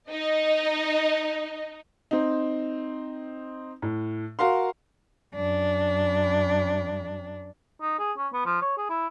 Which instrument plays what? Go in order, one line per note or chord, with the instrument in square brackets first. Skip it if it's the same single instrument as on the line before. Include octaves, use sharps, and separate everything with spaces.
[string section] D#4 [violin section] D#5
[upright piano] C4 D#4
A2
F#4 A#4 F5 C6
[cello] F#2 D4
[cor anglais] D#4
G#4
C#4
B3
F3
C#5
G#4
E4